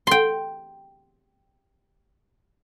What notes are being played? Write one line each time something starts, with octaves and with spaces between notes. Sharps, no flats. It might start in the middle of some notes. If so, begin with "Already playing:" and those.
G5 C6